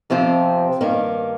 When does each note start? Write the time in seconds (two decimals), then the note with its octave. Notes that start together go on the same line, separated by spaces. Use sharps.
0.10 F2 C3 F3 C4
0.81 G2 D#3 A#3